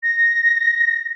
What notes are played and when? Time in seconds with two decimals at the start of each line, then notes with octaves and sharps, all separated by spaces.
0.03 A#6